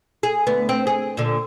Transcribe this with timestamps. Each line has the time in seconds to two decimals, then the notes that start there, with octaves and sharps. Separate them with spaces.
0.23 G#4
0.47 D2 B3
0.69 C4
0.87 G#4
1.17 A#2 D3